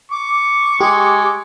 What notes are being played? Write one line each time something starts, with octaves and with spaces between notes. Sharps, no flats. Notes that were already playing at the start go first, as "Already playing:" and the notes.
C#6 D6
G#3 G4